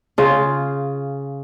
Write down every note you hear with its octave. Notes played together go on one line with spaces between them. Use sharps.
C#3 F4